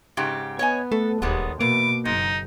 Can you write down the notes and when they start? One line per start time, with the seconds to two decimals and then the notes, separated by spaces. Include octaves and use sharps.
0.17 G#2 C#3 G4
0.59 B3 C#5 D#5 G#5
0.92 A3 A4
1.22 D1 D#2 G3 G#3 B3
1.61 E2 B2 A#3 B4 D6
2.05 F#1 G#2 D#4